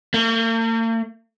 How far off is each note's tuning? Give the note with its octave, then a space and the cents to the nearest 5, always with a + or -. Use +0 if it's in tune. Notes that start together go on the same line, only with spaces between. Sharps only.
A#3 -45